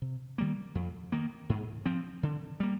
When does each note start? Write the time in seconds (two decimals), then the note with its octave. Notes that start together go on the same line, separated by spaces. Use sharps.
0.02 C3
0.38 D#3 G3 A#3
0.75 F2
1.12 D#3 A#3
1.50 G#2
1.86 F3 C4
2.23 D3
2.60 G3 A#3